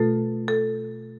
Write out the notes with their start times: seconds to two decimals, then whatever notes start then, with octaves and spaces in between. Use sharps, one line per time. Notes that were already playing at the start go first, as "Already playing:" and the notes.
Already playing: B2 A3 F4 A4
0.48 A4